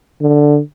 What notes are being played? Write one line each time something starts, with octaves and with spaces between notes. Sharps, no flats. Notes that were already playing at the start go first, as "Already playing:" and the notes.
D3